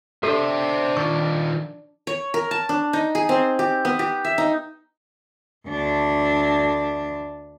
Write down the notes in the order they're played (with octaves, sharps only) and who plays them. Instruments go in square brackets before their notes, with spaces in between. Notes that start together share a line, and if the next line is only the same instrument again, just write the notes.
[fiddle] D4 [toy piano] G4 A4 [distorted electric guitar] C5 E5
[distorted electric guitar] D#3 F4 [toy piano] C#6
[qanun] C#5
A#4
A5
D4
D#4
G#4
C4
G4
B3
G4
E5
D#4
[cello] D2 D4